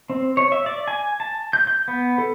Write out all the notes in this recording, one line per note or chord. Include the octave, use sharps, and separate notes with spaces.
C4
C#5
E5
D5
G#5
A5
G6
G6
B3
A4